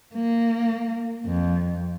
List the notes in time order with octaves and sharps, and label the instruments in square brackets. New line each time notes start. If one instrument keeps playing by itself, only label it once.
[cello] A#3
F2